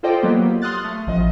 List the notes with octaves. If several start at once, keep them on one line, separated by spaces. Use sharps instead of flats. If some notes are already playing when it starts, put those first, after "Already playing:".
F4 A4 C5 D5 D#5 G5
F#3 A#3 B3 G4
C6 D#6 F6 F#6 A6
A3
A1 F3 D#5